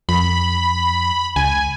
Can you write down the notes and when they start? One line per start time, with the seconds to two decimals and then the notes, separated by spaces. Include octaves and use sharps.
0.09 F2 B5
1.36 C#2 G#5